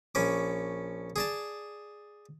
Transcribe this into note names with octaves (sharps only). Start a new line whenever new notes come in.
A#1 C#4 D6
G#4 D5 A5